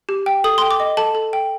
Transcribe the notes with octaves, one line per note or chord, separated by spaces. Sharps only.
G4
G5
A4 D#6
G5 C6
D6
D#5
A4 A5
A4
G5